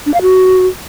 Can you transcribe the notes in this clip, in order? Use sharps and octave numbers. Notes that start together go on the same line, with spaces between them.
D4
F5
F#4